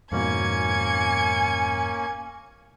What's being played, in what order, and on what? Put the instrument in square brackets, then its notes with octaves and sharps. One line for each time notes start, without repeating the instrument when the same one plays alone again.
[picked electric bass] F2 G#2 B2 [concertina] A#3 C#4 [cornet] G#5 [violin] G#6 C#7